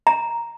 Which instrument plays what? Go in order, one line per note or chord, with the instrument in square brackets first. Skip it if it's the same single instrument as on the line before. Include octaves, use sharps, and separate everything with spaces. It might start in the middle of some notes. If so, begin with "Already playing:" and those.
[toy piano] A#5